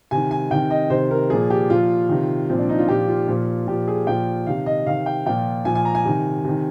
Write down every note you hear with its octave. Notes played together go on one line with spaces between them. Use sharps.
C3 D#3 G#5
G#5
C3 D#3 G5
D#5
C3 D#3 C5
A#4
A#2 F3 G#4
G4
A#2 F3 F4
C3 D#3
A#2 F3 C4
D4
D#4
F4
A#2 F3 G4
F4
A#2 F3
A#2 F3 G4
G#4
A#2 F3 G5
C3 D#3 F5
D#5
C3 D#3 F5
G5
A#2 F3 G5
A#2 F3 G#5
G#5
A#5
G#5
C3 D#3
C3 D#3